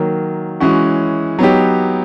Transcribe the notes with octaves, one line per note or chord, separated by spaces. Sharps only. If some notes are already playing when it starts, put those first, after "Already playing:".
Already playing: D#3 F#3 A#3
E3 G#3 C#4 F#4
F#3 B3 D#4 G4